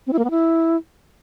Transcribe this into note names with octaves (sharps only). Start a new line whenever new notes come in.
C4
E4
A#3
B3
E4